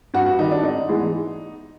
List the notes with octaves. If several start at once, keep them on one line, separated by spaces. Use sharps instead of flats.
G2 F#4
F#4
D#3 G3 D#4
D4
G#2 D#4
E3 G#3 B3